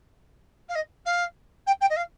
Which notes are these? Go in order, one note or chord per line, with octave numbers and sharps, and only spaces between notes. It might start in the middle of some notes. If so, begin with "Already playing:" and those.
F5
D#5
F5
G5
G5
D#5
F5